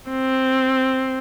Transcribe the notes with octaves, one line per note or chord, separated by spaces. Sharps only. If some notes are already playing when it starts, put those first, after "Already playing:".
C4